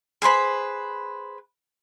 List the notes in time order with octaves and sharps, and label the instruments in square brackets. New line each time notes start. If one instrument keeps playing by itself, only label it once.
[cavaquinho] G#4 B4 C5 B5